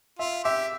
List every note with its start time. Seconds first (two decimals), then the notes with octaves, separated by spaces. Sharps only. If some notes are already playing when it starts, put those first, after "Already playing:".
0.19 F4 E5
0.44 G4 E5